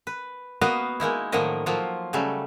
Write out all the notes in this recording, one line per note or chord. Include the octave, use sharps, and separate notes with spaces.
B4
A#3 B3 F#4 B4 D#5 F5
G#3 A#3 D#4 E4
A2 D#3 F3 F#3 A#3 D#5
F3 F#3 A#3 F4
C#3 F#3 G3 A3